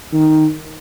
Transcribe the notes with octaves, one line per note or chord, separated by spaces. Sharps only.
D#3